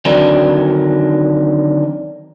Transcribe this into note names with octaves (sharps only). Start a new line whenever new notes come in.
D3 D#3 F#3 C4 D4 D#4